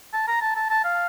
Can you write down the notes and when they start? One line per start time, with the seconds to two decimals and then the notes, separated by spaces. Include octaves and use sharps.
0.14 A5
0.28 A#5
0.42 A5
0.56 A5
0.70 A5
0.84 F5